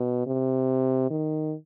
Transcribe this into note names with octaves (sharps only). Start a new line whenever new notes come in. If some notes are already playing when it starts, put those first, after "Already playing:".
Already playing: B2
C3
D#3